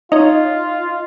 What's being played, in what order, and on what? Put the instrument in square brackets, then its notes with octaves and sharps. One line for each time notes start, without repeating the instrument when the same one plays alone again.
[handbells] D#4 C#5 [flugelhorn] F4 [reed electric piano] D#5